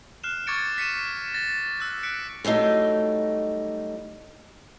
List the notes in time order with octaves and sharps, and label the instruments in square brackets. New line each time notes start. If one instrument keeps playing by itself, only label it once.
[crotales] F6 F#6 C7 E7 G7
C#6 D6 G#6 A6 C#7 D7
B6 C#7 D#7 E7
A6 A#6
E6 F#6 A6
F#6 B6 C#7 D7
[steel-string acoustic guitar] F#3 G3 A3 D#4